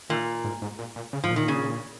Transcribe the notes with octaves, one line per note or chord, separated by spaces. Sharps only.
A#2 D#3
G#2
G#2
A#2
A#2
C#3
G#2 F3
A#2
D#3
C#3